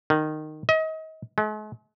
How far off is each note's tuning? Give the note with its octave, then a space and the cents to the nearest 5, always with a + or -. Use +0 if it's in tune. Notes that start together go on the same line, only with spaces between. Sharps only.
D#3 -15
D#5 +30
G#3 +45